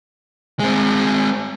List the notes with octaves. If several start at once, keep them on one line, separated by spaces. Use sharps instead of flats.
G#3 C4